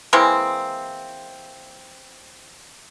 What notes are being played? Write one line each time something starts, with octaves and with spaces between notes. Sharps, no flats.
E3 G#3 A#3 C4